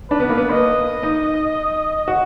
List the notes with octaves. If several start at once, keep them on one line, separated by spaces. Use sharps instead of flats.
D4 B4
B3
A#3
B3
A#3 D#5
D#4
F#4